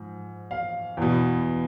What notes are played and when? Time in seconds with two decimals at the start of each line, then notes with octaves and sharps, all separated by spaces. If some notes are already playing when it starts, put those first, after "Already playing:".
Already playing: G#2 F3
0.51 F5
0.97 E2 B2